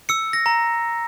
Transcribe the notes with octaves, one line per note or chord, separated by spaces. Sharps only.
E6 C#7
A#6
A#5